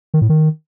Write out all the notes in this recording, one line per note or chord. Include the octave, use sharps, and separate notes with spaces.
D#3
A2
D#3